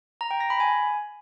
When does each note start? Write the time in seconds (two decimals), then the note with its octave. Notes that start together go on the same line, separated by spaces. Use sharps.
0.21 A#5
0.31 G5
0.40 A#6
0.50 B5
0.60 G#5